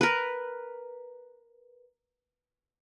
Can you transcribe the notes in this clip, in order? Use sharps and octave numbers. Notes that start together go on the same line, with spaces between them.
A#4 B4